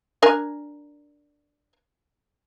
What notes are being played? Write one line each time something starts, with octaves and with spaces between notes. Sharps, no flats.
D4 A#4 G#5